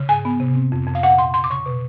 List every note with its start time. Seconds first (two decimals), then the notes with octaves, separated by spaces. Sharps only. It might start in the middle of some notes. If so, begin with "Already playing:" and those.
Already playing: C#3
0.09 G#2 G#5
0.25 B3
0.40 C3
0.55 C4
0.72 F2
0.87 F2
0.95 F5
1.03 A#2 F#5
1.18 A#2 C6
1.34 C#3 C6
1.44 D6
1.50 C#3 C#6
1.66 B2